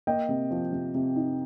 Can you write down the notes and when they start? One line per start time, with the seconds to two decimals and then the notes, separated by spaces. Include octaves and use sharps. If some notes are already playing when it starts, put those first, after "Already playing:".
0.07 A#3 D#5 G5
0.29 C3
0.51 F3
0.72 C3
0.94 C3
1.16 D#4